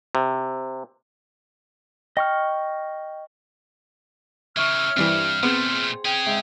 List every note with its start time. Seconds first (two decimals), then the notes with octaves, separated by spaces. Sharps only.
0.15 C3
2.17 D#5 G5 C#6 F6
4.57 C#3 E3 E5 C#6 E6 F6
4.97 G2 E3 G3 C4
5.43 A#2 A3 B3 C4 G#4 C5
6.05 C#4 G#4 G5
6.26 G#2 E5 G6